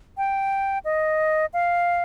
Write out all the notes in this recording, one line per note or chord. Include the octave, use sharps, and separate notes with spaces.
G5
D#5
F5